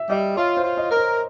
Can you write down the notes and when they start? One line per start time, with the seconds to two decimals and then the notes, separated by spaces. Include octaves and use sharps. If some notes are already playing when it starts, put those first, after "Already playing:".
Already playing: E5
0.09 G3 D#5
0.36 F4 C#5
0.57 C5
0.64 F4
0.77 D#5
0.91 A#4
0.97 C5